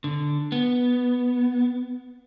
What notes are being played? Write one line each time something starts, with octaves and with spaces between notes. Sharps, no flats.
D3
B3